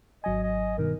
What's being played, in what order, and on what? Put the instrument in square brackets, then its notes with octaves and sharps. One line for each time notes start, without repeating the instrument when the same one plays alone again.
[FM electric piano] G#1 F#3 G#5 [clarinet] D#5
[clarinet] D#5
[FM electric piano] G2 B2 D#3 [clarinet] A#4